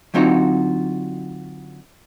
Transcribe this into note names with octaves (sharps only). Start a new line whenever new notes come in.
D3 F#3 C4 D#4 F4 F#4